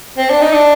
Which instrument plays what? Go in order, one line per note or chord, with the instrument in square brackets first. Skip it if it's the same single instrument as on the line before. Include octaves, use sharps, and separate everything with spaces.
[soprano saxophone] C4
D4
D#4
D4